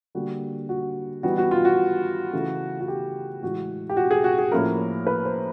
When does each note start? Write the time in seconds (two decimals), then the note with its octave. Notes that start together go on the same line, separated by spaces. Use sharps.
0.15 D3 G3 A#3 F#4
0.69 F#4
1.23 E3 G3 B3 D#4 F#4
1.38 F#4
1.51 F4
1.65 F#4
2.33 C#3 E3 A3
2.80 F#4
2.88 G4
3.42 A2 E3 G#3 F#4
3.90 G4
3.97 F#4
4.11 G#4
4.24 F#4
4.38 G#4
4.52 A2 F3 A#3 C#4 E4 A#4
5.07 B4
5.25 C5